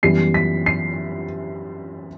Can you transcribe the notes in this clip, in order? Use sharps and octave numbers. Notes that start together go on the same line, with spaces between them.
F#2 E3 G3 B3 C7
B6
C7